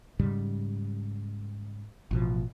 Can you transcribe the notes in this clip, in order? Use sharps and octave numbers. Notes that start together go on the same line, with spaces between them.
G#2 C#3 G3
A1 B2 F3